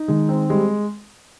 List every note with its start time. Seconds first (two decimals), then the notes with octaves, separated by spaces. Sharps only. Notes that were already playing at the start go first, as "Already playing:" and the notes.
Already playing: D#4
0.08 D#3 G#3
0.29 C4
0.49 G3 G#3